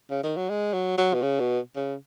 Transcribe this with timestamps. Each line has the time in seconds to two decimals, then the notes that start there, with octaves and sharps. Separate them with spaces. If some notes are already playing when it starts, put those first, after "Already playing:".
0.10 C#3
0.23 D#3
0.37 F#3
0.49 G#3
0.73 F#3
0.98 F#3
1.13 B2
1.22 C#3
1.40 B2
1.76 C#3